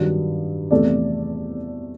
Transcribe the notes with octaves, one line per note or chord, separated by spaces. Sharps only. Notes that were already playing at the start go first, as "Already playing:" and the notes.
Already playing: G2 D#3 F#3
E2 C3 E3 A3 D5